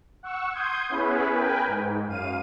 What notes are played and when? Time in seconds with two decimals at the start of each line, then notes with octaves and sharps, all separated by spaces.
0.23 F#5 C#6 E6
0.53 C6 D#6 G6 G#6
0.89 B3 C#4 E4 G#4 B4
1.32 A#4 B4 G5 G#5
1.67 G#2
2.07 F#2 F5 D#7